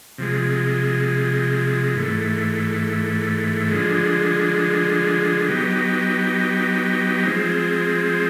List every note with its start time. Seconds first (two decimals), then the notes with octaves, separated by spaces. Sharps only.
0.18 C3 F3 G#3
1.96 G#2 E3 A3
3.71 D3 F3 G#3
5.49 F#3 B3 D#4 G4
7.25 F3 G#3 C4